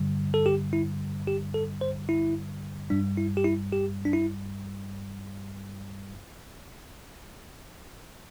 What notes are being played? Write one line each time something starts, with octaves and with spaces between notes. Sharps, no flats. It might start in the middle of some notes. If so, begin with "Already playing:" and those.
Already playing: G2 D3 G3
A4
G4
E4
G4
A4
C5
E4
G2 G3 D4
E4
G4
E4
G4
D4
E4